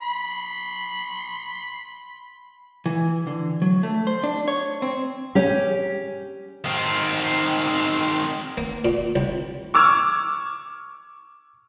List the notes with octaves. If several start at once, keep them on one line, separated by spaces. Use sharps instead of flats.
B5 C6
E3
D3
F#3
A3
C5
D4
C#5
C4
C#4 G4
D#3 C4
A#3
A#2
C2
C#6 D6 E6 F6 G#6